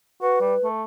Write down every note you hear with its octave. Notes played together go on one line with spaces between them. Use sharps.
F#4 B4
G3
A3